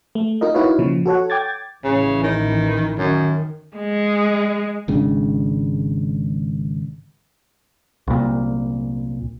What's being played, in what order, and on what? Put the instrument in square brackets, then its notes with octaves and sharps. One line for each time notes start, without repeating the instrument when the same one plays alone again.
[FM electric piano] A3
D#4 F4 A#4 D#5
D#4 E4 F#4 B4 C#5 F5
A#2 C#3 F3
F#4 A4 C#5 F#5
G5 D6 G#6 A6
[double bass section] A1 E3 [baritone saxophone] C#3
[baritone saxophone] D#3
[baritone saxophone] F#2 [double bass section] D#3
[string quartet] G#3
[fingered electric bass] G#1 C#3 G#3 D4
[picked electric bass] C2 A#2